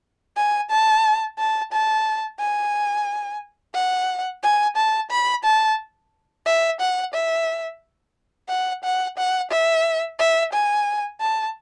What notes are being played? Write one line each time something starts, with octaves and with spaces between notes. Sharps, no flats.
G#5
A5
A5
A5
G#5
F#5
G#5
A5
B5
A5
E5
F#5
E5
F#5
F#5
F#5
E5
E5
G#5
A5